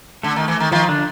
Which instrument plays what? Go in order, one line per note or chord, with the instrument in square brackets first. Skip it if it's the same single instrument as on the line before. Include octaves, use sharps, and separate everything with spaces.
[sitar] D3 [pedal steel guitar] A3 A4
[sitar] D#3
E3
D#3
[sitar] D#3 [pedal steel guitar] F3 F4
[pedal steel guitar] D3 D4